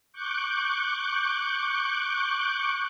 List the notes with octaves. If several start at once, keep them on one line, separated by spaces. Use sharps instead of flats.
C#6 D6 F#6 G6